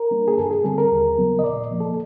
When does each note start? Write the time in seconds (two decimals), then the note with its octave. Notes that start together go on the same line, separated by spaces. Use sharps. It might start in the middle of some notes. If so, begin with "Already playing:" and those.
Already playing: A#4
0.11 G3 A#3 D4
0.28 G#4
0.38 G2 A4
0.51 G#4
0.64 D3 G3 C4 A4
0.78 A#4
0.91 D#2
1.18 C#3 F#3 B3
1.39 D#5
1.44 A#2 D5
1.71 F3 A#3
1.80 A4